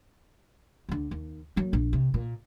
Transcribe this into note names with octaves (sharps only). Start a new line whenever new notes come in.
D2 D3
D#2
F#3 A#3
A#1
C3
A#2